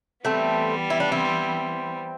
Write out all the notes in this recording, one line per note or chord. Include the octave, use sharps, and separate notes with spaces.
E3 G3 A3 B3 C4
E4
D4
C4 E4